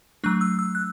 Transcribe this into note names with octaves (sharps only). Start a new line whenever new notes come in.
F#3 A3 D4 F#6
E6
E6
F#6